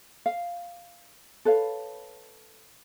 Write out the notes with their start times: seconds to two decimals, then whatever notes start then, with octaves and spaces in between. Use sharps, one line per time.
0.26 F5
1.45 A4 B4 C#5 F5